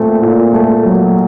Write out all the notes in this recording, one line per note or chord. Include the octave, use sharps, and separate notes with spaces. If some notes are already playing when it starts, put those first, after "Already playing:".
Already playing: A#2 A3 C4
A#2
A3
F#3